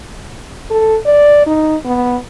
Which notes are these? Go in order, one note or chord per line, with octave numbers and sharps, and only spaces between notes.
A4
D5
D#4
B3